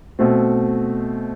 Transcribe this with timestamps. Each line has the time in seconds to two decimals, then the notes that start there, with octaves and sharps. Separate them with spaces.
0.19 B2 A3 C4